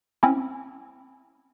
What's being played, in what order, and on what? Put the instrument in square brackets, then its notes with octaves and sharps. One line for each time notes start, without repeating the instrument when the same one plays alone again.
[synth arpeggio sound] C4 C#4 E4